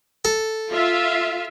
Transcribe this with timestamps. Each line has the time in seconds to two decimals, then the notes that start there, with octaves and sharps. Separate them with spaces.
0.25 A4
0.71 F4 E5 F5